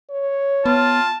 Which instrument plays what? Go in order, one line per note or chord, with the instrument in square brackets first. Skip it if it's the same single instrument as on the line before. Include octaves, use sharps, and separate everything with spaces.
[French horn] C#5
[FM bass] B3 [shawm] F4 [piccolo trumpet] A5